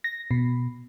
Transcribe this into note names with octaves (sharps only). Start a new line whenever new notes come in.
A#6
B2